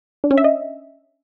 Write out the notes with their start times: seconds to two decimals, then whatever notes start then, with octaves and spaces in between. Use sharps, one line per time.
0.24 D4
0.31 C#4
0.37 E5
0.44 D#5